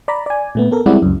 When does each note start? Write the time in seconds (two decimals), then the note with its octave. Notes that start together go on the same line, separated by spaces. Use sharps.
0.08 D5 A#5 B5
0.26 D5 G#5
0.55 A#2 A3 B3
0.71 B3 A4 A#4
0.86 G3 G#3 C4 E4 D5 F#5
1.02 C#2 F#2